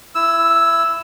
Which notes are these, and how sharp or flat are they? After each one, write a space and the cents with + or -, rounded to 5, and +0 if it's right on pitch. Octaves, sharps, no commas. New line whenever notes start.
E4 +20 E6 +0